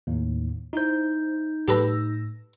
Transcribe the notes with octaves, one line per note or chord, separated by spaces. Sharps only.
D#2 A2
D#4 E4 C5 G6
A2 G4 A4 B4 E6 A#6